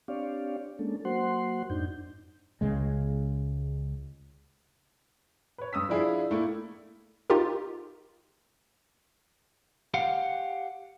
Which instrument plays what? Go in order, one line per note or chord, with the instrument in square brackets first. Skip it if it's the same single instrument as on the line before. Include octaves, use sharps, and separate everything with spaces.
[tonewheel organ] C4 D4 G4 C#5 D5 F5
G#3 A#3 C#4 D4 A4
F#3 A#3 F#4 C5 F#5 C6
F2 G#2 D4 D#4 G6
[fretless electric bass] C#2 C#3 G#3
[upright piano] B4 C#5
G2 D#6 E6 B6
F3 D4 E4 G#4 F5
A2 A3 A#3 E4
[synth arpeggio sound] D#4 F4 G4 A#4
[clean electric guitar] G4 F5 F#5